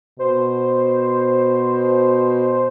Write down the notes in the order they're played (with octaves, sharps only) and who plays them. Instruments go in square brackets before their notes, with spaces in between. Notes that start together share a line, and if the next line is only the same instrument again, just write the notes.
[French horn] B2 [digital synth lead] C5